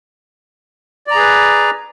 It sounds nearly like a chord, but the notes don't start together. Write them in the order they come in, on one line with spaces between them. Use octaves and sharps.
D5 A#5 G#4 B4